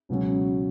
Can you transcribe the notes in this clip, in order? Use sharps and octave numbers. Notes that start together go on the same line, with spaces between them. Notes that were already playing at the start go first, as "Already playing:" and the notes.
C#2 B2 F#3 C#4